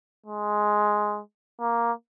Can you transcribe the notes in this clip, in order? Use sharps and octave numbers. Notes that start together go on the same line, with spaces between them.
G#3
A#3